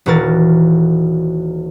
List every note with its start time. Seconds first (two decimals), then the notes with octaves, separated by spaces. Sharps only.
0.06 D#1 E3 F#4 A#4 A6